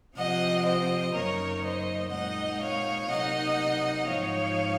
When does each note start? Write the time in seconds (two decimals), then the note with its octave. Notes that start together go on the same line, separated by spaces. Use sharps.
0.15 C3 F3 C4 D#5 F#5
0.64 C5 D#5
1.13 F#2 C#3 F#3 A#3 D#4 A#4 C#5
1.62 C5 D#5
2.11 A#2 G#3 C4 D#4 D#5 F#5
2.60 C#5 F5
3.09 C3 F#3 A#3 D#4 D#5 F#5
4.06 G#2 F3 C4 D#4 C#5 F5